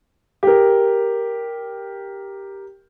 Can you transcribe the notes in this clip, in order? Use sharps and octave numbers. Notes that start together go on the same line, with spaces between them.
G4 A#4